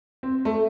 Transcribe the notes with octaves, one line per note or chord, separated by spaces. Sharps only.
C4
A3